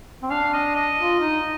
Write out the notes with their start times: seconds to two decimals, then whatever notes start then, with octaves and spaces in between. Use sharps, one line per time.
0.23 C4
0.30 D4 F5
0.53 D#5
0.75 D#5
0.98 F4
1.21 D#4